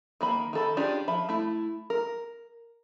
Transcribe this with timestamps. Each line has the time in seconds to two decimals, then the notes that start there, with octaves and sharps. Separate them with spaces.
0.21 D#3 A#3 B5
0.53 D#3 A4 B5
0.77 C#4 D4 F4 G4 G#4
1.08 F3 E5 B5
1.29 A3 E4
1.90 A#4